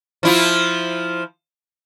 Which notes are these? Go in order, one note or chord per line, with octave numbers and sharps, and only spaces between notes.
F3 E4 F4